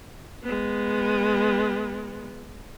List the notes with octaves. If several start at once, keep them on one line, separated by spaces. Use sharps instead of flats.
G#3 B3